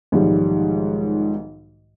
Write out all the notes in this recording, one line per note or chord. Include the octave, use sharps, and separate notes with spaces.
B1 G#2 D#3 F3 G3